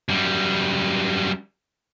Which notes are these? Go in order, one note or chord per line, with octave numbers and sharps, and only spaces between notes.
F#2 G3